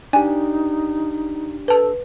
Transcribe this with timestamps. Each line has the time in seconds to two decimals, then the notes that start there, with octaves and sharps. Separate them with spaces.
0.13 D4 D#4 G4 G#5
1.68 A4 B4 A5